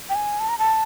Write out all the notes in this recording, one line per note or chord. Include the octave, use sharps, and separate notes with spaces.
G5
G#5
A5
A#5
A5